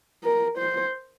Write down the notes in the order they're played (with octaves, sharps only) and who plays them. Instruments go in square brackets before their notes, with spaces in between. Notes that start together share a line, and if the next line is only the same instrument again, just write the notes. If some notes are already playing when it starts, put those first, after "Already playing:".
[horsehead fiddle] A#4
C5